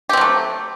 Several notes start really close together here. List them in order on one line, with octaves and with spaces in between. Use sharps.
G4 C4 F#3 A3